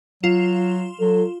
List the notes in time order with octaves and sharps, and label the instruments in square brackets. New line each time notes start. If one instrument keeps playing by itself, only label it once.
[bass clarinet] F#3 [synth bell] F4 E7
[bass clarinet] F#3 [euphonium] A4